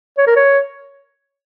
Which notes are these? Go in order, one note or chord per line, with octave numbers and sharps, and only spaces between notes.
C#5
A#4
C#5